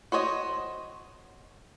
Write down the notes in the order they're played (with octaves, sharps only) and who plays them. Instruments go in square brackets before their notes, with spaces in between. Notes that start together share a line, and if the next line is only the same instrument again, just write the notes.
[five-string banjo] F#4 C5 C#5 D#5